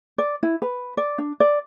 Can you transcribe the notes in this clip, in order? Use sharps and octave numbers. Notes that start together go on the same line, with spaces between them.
D5
E4
B4
D5
D4
D5